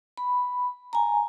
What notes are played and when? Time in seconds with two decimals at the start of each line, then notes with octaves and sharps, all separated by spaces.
0.18 B5
0.93 G#5 A#5